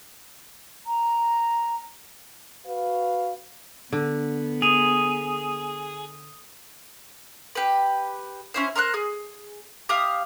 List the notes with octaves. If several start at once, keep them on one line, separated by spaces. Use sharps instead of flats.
A#5
F#4 B4 F5
D3 B3
G#4 D#6 D#7 F7
G4 B4
C#4 E4 C5
A#4 C5 E5 F#6
G#4
G4 E5 F5 D#6